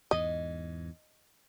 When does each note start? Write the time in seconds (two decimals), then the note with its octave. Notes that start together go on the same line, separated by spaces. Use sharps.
0.11 E2 G#2 D#5